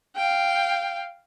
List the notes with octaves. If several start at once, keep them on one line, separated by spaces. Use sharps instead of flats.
F5 G5